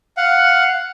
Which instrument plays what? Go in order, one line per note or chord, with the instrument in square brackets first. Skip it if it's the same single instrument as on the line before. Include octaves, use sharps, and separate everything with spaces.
[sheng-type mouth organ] F5 F#5